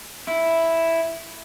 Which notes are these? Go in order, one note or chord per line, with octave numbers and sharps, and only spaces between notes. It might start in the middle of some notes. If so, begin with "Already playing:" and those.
E4